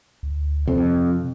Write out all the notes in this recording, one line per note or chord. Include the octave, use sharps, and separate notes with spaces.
D2
F2 C3